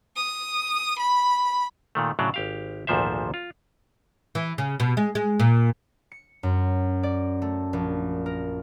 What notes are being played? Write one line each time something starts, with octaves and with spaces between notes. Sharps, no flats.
D#6
B5
A#2 D#3 A3
A2 C#3 F#3 D4
G#1 G4 F5
G#1 D2 A#2 F3 C5 E5
F4
E3
C#3
B2
G#3
G#3
A#2
C#7
F#2
D5
A3
A#1
A#4